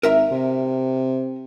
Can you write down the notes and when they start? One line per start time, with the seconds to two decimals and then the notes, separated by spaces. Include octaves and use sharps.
0.03 G#1 A#4 E5 A#5
0.31 C3